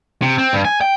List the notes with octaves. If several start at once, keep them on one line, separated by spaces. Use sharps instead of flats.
C3
C4
G2
G#5
G5